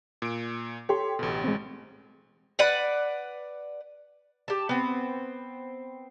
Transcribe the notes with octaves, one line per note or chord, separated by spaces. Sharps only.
A#2 D7
G4 A4 C#5 C6
A1 D2 B2
G#3 C4
B4 D5 F#5
G4 A5
B3 C4